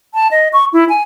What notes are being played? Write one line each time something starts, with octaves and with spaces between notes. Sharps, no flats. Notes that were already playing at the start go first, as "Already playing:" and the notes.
A5
D#5
C#6
E4
G#5